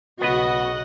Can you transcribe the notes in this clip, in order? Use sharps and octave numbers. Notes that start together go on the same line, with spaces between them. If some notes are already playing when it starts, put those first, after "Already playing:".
B1 C#3 B3 F#4 B4 D#5 F#5